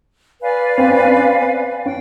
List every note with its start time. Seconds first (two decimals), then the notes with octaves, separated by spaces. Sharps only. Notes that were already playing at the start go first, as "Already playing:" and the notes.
0.42 B4 D5 F5 G#5
0.78 C4
0.91 C#4
1.04 C4
1.85 C#4 G5